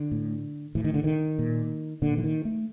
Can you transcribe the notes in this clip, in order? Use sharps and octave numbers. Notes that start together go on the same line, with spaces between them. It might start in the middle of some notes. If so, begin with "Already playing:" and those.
Already playing: D3
A2
A2 E3
D#3
D3
D#3
A#2
A#2 D3
E3
D#3
A3